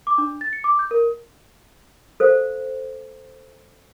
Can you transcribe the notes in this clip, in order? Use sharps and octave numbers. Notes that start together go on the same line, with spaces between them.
D6
D4
A6
C#7
D6
G6
A#4
A4 C5 F5